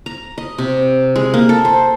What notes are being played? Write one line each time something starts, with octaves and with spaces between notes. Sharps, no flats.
A#5
D#5
C3
G#3
A#3
A4
C5